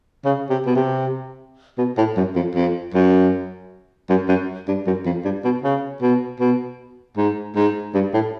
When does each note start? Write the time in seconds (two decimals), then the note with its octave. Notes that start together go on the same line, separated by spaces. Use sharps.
0.25 C#3
0.50 C3
0.66 B2
0.76 C3
1.78 B2
1.97 A2
2.17 F#2
2.36 F2
2.55 F2
2.94 F#2
4.09 F#2
4.29 F#2
4.68 G2
4.87 F#2
5.06 F2
5.24 G2
5.44 B2
5.63 C#3
6.02 B2
6.40 B2
7.17 G#2
7.56 G#2
7.94 G2
8.14 A2